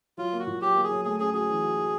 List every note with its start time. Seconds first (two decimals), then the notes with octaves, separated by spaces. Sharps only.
0.18 F#3 F4
0.33 A#3
0.39 F#4
0.47 A#2
0.61 F#3 G4
0.76 A#3
0.83 G#4
0.91 F#3
1.05 A3 G#4
1.20 C#4 G#4
1.34 F#4 G#4
1.49 E3
1.63 F#4
1.77 F#4